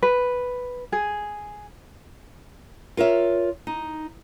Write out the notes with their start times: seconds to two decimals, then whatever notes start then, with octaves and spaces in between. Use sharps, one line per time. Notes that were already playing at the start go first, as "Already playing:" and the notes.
0.03 B4
0.92 G#4
2.97 F4 A#4 C#5 E5
3.67 D#4